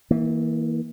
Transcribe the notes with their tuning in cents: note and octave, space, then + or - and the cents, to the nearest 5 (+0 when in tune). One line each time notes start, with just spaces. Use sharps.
E3 -30 A#3 +0